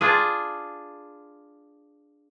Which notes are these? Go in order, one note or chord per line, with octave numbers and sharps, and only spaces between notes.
D4 F4 G#4